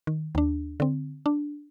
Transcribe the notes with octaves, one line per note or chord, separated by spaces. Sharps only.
D#3
D#2 D4
D3 C4
D4